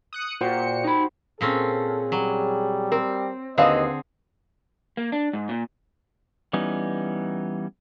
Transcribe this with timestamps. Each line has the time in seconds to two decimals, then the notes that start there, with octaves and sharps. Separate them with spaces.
0.13 D#6 F#6 C#7
0.41 A#2 F#4 G4 C5 C#7
0.84 D#4 B5
1.41 A#2 C4 C#4 G#4 A4
2.12 F#3 G3
2.92 C4 A#4
3.58 D#2 D3 C4 G#4 B4 D#5 F5 A5
4.97 A#3
5.12 D4
5.33 G#2
5.49 A#2
6.53 E3 G3 B3 C#4 D#4